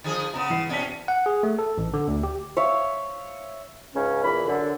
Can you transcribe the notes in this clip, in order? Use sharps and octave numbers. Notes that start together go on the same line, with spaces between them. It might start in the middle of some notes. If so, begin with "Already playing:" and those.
D3 F3 G#4
C#3 B3 A#5
E3 C7
B2 C#4 D5 A5 B6
F#5
G#4
A3
A4
A1
D3
D2
G4
C#5 E5 F5
C#2 G#2 C#3 C#4
E2 A#2 E3 B5
F#2 D3